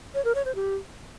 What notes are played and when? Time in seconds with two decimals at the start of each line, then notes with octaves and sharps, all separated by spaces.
0.14 C#5
0.25 A#4
0.35 C#5
0.45 C5
0.55 G4